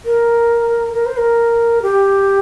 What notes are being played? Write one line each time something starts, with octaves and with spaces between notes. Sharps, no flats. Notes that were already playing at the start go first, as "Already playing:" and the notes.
A#4
A#4
C5
A#4
G4